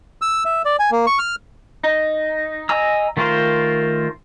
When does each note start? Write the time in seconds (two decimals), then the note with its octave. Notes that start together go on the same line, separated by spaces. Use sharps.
0.22 E6
0.45 E5
0.65 D5
0.79 G#5
0.91 A#3
1.07 C#6
1.19 F6
1.83 D#4
2.69 D#5 G#5 A#5 E6
3.17 D#3 A3 F4 A#4 C5